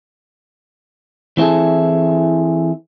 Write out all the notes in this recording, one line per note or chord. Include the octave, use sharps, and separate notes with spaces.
E3 C4 E4 G#4 A4